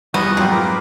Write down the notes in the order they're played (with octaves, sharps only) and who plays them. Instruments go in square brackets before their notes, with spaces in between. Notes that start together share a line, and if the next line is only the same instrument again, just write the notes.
[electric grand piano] E2 G3 [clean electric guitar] F3 [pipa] B3 [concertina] D#5 F#5 C#6
[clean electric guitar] F2 F#3 [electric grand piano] G#2 F4 G5 [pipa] F3
[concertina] A#4 B4 D6